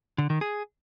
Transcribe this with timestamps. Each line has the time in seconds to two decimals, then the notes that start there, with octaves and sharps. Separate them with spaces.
0.18 D3
0.30 D#3
0.41 G#4